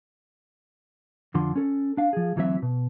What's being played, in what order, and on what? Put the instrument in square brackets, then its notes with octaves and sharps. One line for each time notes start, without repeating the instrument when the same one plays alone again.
[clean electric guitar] F2 D3 F3 C6
C#4 A4
D4 F5
F3 G#4
D2 E3 F#3 C4 E5
B2